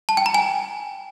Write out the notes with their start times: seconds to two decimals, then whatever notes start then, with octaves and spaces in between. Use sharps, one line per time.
0.09 A5
0.17 G5
0.26 A#5
0.34 G#5